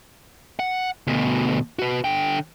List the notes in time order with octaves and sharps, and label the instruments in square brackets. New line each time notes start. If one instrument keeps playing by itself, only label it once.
[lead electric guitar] F#5
D2 B2
F#4 B4
D3 G5